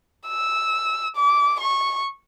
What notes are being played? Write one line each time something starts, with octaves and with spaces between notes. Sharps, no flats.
E6
D6
C#6